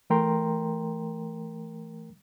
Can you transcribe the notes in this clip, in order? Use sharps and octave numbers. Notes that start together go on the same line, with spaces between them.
E3 A3 A#4 G5 A#5 C6